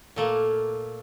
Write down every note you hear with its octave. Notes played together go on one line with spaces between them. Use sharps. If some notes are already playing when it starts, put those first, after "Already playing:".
A#2 A3 A#3